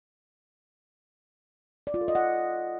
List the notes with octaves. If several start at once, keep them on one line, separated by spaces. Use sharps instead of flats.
D5
F4
A4
D#5
F#5